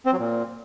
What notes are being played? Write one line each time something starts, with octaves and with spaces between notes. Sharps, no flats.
C4
F#3
A#2